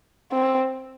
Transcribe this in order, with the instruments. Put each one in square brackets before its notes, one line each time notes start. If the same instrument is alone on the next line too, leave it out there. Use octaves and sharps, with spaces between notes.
[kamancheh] C4